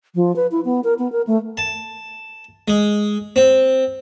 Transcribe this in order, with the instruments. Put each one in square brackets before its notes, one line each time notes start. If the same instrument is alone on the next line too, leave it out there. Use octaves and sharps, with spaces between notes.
[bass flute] F3
B4
E4
B3
A#4
B3
A#4
A3
[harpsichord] A5
G#3
C4